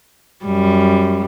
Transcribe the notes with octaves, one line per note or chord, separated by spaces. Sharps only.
F#2 G3